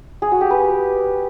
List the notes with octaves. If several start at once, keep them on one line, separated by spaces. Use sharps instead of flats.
G#4
F#4
G4
B4